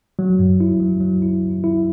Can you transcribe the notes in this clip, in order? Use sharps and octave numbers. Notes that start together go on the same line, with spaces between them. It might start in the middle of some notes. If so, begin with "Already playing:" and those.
F#3
F#2
E4
F#3
F#3
E4
F#2
E4